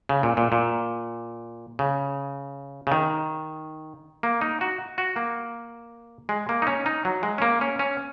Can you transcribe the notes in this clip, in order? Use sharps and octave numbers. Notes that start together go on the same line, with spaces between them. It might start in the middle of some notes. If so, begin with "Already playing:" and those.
C#3
A#2
A#2
A#2
C#3
C#3
D#3
A#3
D#4
F#4
F#4
A#3
G#3
A#3
D#4
C#4
D#4
F#3
G#3
C#4
A#3
C#4
C#4